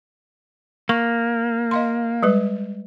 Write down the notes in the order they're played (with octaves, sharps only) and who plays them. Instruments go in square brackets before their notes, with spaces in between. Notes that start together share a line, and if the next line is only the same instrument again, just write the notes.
[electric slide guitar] A#3 [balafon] C#6
[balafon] D#5 F5 C6
G3 G#3 B4